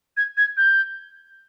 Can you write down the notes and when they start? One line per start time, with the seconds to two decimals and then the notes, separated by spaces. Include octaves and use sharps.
0.17 G#6
0.37 G#6
0.57 G6